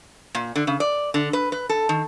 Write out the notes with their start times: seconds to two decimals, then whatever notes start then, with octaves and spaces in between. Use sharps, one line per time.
0.35 A#2
0.56 D3
0.67 C#3
0.80 D5
1.14 D3
1.33 B4
1.52 B4
1.69 A4
1.89 D#3